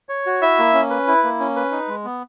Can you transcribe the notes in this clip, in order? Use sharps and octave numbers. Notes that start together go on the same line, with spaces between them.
C#5
F#4
E4 E5
A#3
C#4
B4
E4
A#3
C#4
B4
D#4
G#3
B3